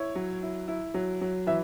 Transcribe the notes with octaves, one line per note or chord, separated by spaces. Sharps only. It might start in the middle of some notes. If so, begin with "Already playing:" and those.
Already playing: E4 C#5
F#3
E4
E4
F#3
F#3
E3 E5